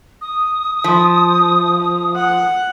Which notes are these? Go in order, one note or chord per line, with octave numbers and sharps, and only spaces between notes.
D#6
F3
F#5